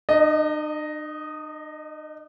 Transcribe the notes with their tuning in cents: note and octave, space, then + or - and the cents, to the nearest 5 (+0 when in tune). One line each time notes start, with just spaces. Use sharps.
D#4 -45 D#5 +0